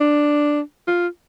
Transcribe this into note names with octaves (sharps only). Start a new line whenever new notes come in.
D4
F4